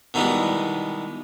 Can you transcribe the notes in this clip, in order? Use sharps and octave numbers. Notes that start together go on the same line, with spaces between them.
B2 D#3 E3 G3 G#3 B3